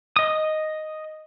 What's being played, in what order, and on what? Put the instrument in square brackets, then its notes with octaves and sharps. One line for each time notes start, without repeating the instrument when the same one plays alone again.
[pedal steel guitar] D#5 D#6